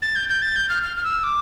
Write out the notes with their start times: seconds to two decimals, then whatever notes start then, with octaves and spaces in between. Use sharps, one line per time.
0.02 A6
0.16 G6
0.29 G6
0.42 A6
0.56 G6
0.69 F6
0.83 F6
0.97 F6
1.04 E6
1.23 D6